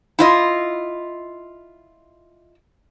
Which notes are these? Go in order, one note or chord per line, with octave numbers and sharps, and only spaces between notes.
E4 F4 D#5